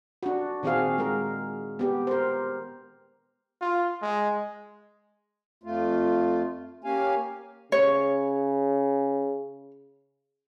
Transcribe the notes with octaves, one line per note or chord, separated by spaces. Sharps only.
D4 F#4
A#2 D#3 C4 F#4 G#4 F5
G#3 A#4
B3 G4
A#4 C5
F4
G#3
F2 A3 F4
A#3 C#4 G4 F5 G#5
C#3 C#5